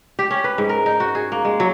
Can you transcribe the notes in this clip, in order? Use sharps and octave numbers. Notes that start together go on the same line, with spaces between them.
G4
C#4
B4
G#2
A#4
D#4
F#4
G#4
A#3
G#3
F#3